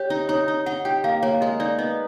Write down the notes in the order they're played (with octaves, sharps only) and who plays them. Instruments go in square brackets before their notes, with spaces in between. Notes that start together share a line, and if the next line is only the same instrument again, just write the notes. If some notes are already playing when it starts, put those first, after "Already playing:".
Already playing: [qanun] G4 [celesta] C#5
[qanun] D#4
[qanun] D#4 [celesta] C#5
[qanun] D#4
[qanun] D#4 [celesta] F#5
[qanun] G4 [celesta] G5
[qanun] A#3 [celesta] F5
[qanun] A#3 [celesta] C#5
[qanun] G#3 [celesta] D#5
[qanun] D#4 [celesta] D5
[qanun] B3 [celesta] D#5